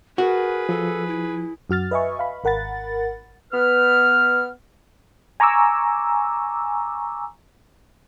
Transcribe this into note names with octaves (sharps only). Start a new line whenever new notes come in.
F#4 G#4 A#4 B4
F3 A4
E4
F#2 F#4 F6 A6
B4 D#5 E5 G#5 C#6
F5 B5
G#1 A#4 F#5 B5 A6
B3 B4 F6
G#5 A#5 C#6 D6 E6